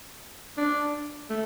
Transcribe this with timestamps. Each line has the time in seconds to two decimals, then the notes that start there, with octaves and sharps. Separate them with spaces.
0.58 D4
1.30 A3